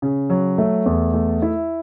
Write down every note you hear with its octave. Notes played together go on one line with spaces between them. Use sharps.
C#3
F#3
A3
E2
A3
E4